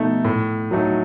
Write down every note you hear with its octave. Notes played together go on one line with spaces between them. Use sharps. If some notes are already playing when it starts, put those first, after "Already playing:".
Already playing: B2 A3 D#4
A2
F#3 A3 D#4